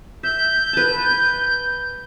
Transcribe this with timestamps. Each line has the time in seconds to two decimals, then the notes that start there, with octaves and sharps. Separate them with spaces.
0.23 E5 G6
0.73 B4 A5